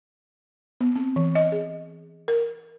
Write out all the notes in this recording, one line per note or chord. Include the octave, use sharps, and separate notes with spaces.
B3
C4
E3
D#5
G#4
A#4